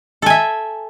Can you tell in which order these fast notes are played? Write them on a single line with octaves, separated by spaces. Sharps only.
A4 G#5 E5